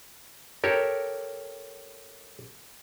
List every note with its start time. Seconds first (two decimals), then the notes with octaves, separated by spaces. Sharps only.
0.64 G4 A4 A#4 C#5